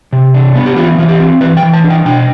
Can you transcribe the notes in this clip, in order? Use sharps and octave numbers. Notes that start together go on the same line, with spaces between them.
C3
D4
B3
G4
E3 F4
E3 F4
G4
C4
E3 B4
G5
E3
A5
D4
G5
B2 G5